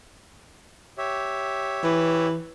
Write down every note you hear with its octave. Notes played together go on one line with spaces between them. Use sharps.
G4 C#5 E5
E3